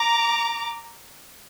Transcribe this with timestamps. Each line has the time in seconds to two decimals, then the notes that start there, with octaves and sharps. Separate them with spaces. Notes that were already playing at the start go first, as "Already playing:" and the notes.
Already playing: A#5 D6